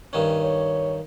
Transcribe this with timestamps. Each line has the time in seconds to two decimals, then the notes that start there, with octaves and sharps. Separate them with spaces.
0.13 G2 D#3 C#4
0.43 C#5